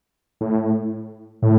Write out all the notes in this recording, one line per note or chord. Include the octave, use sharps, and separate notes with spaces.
A2
A2